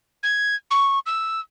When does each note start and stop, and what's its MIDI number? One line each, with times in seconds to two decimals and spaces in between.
0.23 0.55 92
0.71 0.99 85
1.06 1.40 88